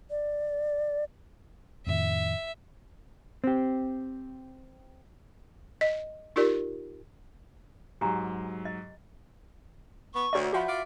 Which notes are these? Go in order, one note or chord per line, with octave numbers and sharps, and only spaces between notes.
D5
F2 A2 D#3 E5
C4 G4
D#5
D#4 F4 G4 A#4 D5
G#2 F#3 G4 G#5 A#5
D#5
B3 C#6
D2 F#4 C#5 D5
F3 F#4 E5 F#5 B5
F4 D5